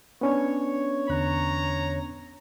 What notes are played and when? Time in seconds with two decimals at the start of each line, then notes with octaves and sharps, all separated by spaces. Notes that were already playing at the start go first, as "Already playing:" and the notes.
0.21 B3 C#4 D4 C#5
1.09 E2 D3 A#5 F#6